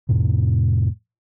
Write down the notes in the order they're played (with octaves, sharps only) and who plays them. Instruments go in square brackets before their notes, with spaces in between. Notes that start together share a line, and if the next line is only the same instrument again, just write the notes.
[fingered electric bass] F2 A2 C3